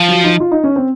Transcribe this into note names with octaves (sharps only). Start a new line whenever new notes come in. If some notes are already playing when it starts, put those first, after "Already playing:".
Already playing: F3
F#3
D#4
F4
D#4
C#4
C4